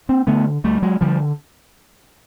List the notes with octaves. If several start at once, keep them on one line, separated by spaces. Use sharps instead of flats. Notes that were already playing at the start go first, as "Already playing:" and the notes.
A#3 C4
D3 A3 B3
D2 G3 A3
F#3 G#3
D3 F3 G3